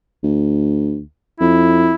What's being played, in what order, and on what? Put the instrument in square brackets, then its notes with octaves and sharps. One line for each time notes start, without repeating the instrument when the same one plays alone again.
[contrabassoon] D2
[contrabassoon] F2 [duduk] E4